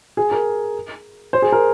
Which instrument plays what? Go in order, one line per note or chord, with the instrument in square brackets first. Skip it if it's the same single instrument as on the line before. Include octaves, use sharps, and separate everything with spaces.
[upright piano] G#4
A#4
C5
G#4
A#4